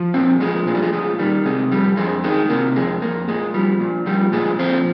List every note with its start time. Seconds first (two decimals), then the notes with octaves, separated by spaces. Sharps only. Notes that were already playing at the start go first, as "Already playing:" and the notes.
Already playing: F3
0.14 A#2 C4
0.40 F3 G#3
0.67 A#2 G#3
0.75 G3
0.83 G#3
0.93 F3 G#3
1.19 D#3 G3
1.45 C3 G#3
1.71 F2 G3
1.97 F2 G#3
2.24 D#3 G#3
2.49 C3 A#3
2.76 F2 G#3
3.02 F2 A#3
3.28 A#2 G#3
3.54 F3 G3
3.80 A#2
4.06 F3 G3
4.33 A#2 G#3
4.59 F3 C4